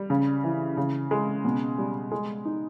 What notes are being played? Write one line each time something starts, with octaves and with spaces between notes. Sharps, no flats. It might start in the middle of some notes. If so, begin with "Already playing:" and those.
Already playing: G3
C#3
E3
C#3
G#3
B2
G3
G#3
D#4